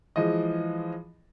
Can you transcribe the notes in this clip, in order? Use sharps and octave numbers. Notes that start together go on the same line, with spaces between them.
E3 F3 G#3 D#5